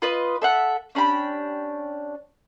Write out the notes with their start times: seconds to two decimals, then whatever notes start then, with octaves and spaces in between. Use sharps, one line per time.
0.02 F4 B4 D#5
0.42 A4 E5 F#5
0.95 C#4 D4 G4 B5